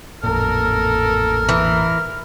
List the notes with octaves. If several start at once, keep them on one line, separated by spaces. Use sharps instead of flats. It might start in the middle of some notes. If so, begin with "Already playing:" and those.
A1 F2 A#2 A4 A#4 F6
E3